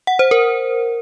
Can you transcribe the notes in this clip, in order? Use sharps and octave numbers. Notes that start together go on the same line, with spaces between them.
F#5
C5
A#4